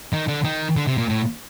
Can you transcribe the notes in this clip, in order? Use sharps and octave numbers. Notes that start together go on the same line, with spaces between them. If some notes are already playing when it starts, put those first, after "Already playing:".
D#3
D3
D#3
D3
C3
A#2
A2